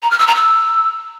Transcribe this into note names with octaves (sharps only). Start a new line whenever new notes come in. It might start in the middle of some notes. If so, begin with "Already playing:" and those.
A#5
F6
E6
A#5
E6